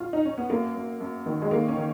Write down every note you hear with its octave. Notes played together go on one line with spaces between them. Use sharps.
F4
D#4
C#4
B3
F#2 A#3
F#2
F#2
D#3
G#3
D#3 A#3
C#4
D#3